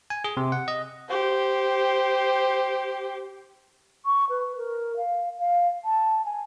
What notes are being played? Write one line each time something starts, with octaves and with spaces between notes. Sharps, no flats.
G#5
G#4
C3
F#5
D#5
G4 C5
C#6
B4
A#4
F5
F5
A5
G#5